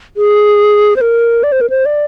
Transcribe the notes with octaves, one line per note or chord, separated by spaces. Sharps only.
G#4
C5
A#4
D5
C5
A#4
C5
D5